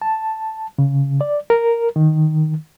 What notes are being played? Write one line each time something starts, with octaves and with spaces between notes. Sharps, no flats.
A5
C#3
D5
A#4
D#3